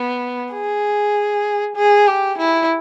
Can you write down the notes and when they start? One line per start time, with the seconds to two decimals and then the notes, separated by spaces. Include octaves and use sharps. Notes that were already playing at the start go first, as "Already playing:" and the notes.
Already playing: B3
0.53 G#4
1.76 G#4
2.07 G4
2.38 E4